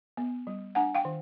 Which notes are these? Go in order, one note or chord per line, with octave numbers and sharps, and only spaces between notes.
B3
G3
D4 F#5 G#5
F5 G5
D#3